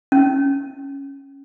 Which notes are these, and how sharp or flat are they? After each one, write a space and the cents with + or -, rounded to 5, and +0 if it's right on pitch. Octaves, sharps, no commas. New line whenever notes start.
C#4 -5